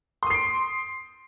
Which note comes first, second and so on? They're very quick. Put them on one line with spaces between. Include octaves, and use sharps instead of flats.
C6 D#6 C7 D7